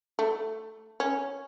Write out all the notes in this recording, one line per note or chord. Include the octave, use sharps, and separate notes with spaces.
A3
C#4